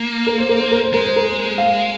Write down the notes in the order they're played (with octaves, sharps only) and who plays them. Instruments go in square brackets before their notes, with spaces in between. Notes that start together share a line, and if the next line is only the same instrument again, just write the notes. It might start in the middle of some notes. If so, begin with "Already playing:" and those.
Already playing: [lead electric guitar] A#3
[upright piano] A#4
C5
A#4
C5
A#4
C5
[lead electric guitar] G#3 [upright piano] A#4
[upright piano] C5
A#4
F5